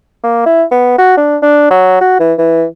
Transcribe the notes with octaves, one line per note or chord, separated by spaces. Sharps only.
A#3
E4
B3
F#4
D4
D4
F#3
F#4
E3
E3